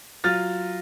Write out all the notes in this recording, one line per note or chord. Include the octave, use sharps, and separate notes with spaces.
F#3 F4 F6 A6